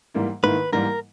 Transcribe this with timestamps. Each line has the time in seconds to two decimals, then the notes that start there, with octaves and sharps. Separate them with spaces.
0.14 G#2 E3 G3 A#3 E4
0.43 G#2 D#3 A#3 E4 B4
0.73 G#2 E3 G3 A#3 A#4